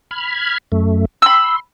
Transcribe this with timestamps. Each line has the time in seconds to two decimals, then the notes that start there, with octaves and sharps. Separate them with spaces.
0.11 B5 F6 G#6
0.72 F#2 A3
1.22 B5 C6 E6